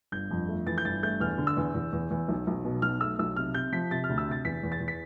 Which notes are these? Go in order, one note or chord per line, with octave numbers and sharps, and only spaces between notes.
G1 G6
F2
A3
E3 A6
G6
G1 A6
A3 G6
E2 F6
D3
E6
E2
E2
E2
E2
B1
B1
B2
B1 F6
A3 E6
B1 E6
C3 F6
C3 G6
F3 B6
C3 A6
F6
D2
E6
C3 A6
E2 B6
E2
A6
E2
B6